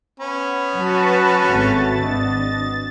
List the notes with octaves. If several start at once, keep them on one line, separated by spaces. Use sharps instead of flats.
B3 C#4 B5
F#3 F#4 B4 A5
G#1 G#2 A3 A6
G#1 D4 D#5